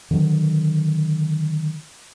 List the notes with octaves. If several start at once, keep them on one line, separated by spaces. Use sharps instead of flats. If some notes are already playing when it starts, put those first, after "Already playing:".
D3 D#3 F#3